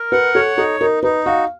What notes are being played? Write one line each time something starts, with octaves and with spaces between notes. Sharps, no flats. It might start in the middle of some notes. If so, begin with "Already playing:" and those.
Already playing: A#4
B4 F#5
A4 C#5
D#4 A4
D#4 A#4
D#4 B4
F#4 F5